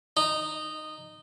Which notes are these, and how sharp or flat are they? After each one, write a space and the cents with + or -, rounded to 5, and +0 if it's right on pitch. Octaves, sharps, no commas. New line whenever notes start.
D#4 -15